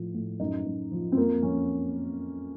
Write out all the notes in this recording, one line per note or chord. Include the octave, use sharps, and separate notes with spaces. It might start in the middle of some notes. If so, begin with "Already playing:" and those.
Already playing: A2 F3
A2
F#2 D#4
F#2
F3
C4
F2 A#3
F2 C#4